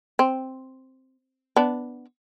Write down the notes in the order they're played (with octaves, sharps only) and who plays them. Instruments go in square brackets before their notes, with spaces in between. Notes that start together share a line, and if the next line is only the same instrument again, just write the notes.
[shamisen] C4
B3 D4